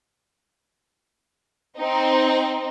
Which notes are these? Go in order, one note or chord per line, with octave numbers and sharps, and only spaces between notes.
C4 D#4